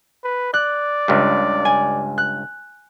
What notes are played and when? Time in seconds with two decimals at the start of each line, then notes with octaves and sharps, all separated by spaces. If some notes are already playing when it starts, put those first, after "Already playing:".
0.24 B4
0.54 D5 F#6
1.08 C#2 G2
1.65 G#5
2.18 F#6